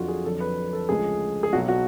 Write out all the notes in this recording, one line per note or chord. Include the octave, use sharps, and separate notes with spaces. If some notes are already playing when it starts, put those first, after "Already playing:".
Already playing: F2 D3 F#3 F4 F#4
G#4
F2 D3 F#3 A4
B4
A4
D2 C#3 F3 G#3 G#4
G#4
B1 B2 F#3 F#4
F#4